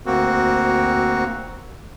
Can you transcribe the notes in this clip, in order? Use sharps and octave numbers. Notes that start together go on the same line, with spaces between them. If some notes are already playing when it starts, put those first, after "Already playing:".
D2 A#3 C4 F#4